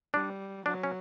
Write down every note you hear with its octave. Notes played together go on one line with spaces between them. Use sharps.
G3 D4
F#3 D4
C#4